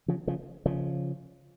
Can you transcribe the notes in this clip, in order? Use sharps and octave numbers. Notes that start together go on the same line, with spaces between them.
C#3 F3
C#3 F3
C#3 F3